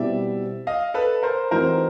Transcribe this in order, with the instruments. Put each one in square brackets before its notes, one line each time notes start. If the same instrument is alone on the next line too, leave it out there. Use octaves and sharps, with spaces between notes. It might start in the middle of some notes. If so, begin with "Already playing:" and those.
Already playing: [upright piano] B2 G3 C4 E4 G4 [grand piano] D5 E5
[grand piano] D#5 F5
A4 B4
A#4 C5
[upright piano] E3 A3 C4 D#4 F#4 [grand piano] A#4 C5